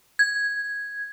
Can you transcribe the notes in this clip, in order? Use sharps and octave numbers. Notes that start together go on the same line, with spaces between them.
G#6